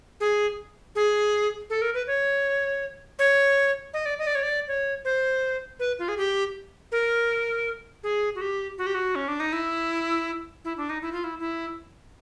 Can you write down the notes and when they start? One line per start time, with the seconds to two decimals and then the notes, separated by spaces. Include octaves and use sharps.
0.20 G#4
0.95 G#4
1.70 A4
1.82 A#4
1.94 B4
2.07 C#5
3.19 C#5
3.94 D#5
4.06 D5
4.19 D#5
4.27 D5
4.35 C#5
4.43 D5
4.68 C#5
5.05 C5
5.79 B4
5.99 F4
6.08 G#4
6.18 G4
6.92 A#4
8.03 G#4
8.35 F#4
8.41 G4
8.78 F#4
8.87 G4
8.95 F#4
9.15 C#4
9.28 D4
9.40 D#4
9.53 E4
10.65 E4
10.77 D4
10.90 D#4
11.02 E4
11.12 F4
11.24 E4
11.39 E4